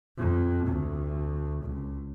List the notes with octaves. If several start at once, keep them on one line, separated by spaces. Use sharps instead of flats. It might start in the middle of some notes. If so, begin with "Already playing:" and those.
F2
D2
C#2